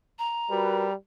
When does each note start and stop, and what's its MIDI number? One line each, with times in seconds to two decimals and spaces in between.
0.19 0.92 82
0.51 0.94 55
0.51 0.88 66
0.51 0.88 70
0.51 0.88 71